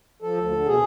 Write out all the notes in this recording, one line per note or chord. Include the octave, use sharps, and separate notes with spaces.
F3 A4
D2
D3
B2 G#4